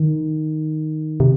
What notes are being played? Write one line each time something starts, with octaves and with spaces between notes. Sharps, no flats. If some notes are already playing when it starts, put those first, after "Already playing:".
Already playing: D#3
C3